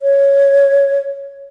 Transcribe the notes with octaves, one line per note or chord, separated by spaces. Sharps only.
C#5